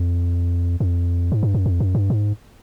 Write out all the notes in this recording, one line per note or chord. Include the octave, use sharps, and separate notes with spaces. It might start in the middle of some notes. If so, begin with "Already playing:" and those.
Already playing: F2
F2
G#2
G2
F#2
F2
F#2
G2
G#2